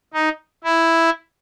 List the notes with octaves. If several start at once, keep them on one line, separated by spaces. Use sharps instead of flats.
D#4
E4